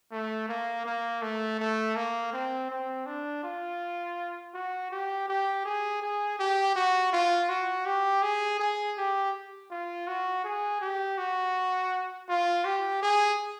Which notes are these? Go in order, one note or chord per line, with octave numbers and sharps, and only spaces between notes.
A3
A#3
A#3
A3
A3
A#3
C4
C4
D4
F4
F#4
G4
G4
G#4
G#4
G4
F#4
F4
F#4
G4
G#4
G#4
G4
F4
F#4
G#4
G4
F#4
F4
G4
G#4